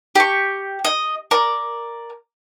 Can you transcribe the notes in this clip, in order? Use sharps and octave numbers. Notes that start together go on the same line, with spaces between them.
G4 C#6
D#5
A#4 D5